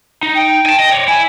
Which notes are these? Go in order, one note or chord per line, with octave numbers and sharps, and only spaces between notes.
D#4
G5
G#5 A5
D#5
C#5 D5
E4 G#5